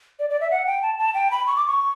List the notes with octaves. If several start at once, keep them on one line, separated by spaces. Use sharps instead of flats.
D5
D5
E5
F#5
G5
A5
A5
G5
B5
C#6
D6
C#6